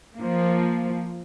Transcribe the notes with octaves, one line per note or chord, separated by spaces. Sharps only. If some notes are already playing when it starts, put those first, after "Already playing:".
F3 A#3